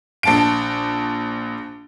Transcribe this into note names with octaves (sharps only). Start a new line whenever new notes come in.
A#1 A5 D7